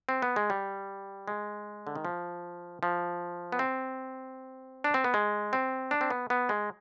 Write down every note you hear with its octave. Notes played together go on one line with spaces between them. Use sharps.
C4
B3
G#3
G3
G#3
D3
D#3
F3
F3
B3
C4
D4
C4
B3
G#3
C4
D4
C4
B3
B3
G#3